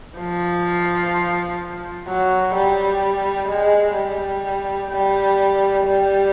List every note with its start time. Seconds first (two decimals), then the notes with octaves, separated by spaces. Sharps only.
0.18 F3
2.08 F#3
2.55 G3
3.49 G#3
3.96 G3
4.91 G3
5.85 G3